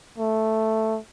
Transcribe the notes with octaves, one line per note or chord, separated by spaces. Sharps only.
A3